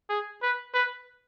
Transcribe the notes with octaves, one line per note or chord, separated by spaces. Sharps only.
G#4
B4
B4